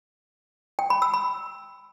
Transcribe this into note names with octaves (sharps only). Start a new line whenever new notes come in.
G5
B5
E6
B5